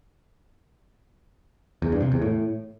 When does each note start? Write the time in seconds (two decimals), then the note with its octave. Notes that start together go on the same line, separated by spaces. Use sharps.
1.82 E2
1.92 G2
2.02 C3
2.12 E2
2.22 A2